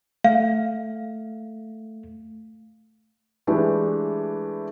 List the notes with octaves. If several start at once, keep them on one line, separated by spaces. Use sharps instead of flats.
A3 F5
E3 G#3 A3 D4 G4 B4